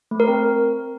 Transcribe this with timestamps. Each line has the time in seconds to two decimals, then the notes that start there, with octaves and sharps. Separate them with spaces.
0.11 A3
0.20 A#4
0.28 C4